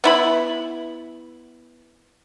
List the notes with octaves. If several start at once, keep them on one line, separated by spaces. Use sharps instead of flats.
B3 E4 B5